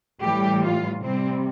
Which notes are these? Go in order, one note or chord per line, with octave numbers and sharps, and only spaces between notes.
A2 E3 G3 G4
F4
C3 G3 C4